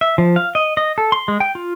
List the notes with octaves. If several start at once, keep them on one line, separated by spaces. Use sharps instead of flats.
E5
F3
F5
D#5
D#5
A4
C6
G#3
G5
F4